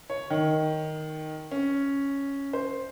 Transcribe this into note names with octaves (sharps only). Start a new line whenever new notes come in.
C#5
D#3
C#4
C5